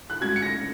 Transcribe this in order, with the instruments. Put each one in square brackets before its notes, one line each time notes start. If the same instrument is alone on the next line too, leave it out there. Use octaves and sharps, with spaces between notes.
[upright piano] F#6
[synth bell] G#3 C#4 F#4 [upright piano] G#6
[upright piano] C#7
A#6